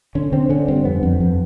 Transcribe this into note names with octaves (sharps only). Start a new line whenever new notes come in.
D3 C#4
D3 C4
D3 C#4
G2 C4
F2 B3
F2
F2